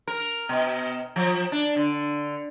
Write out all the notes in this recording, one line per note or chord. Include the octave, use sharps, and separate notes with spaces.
A#4
B2
F3
D4
D3